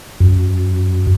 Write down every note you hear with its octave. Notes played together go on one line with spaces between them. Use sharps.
F#2